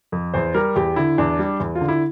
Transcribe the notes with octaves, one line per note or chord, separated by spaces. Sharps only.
F2
E2 C5
G3 A#4
E2 G4
D3 E4
E2 D4
G3
E2
F4
D3
E4